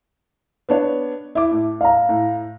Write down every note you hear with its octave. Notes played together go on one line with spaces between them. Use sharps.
B3 D4 C#5
E4 E5 D6
A2
F5 A#5
A2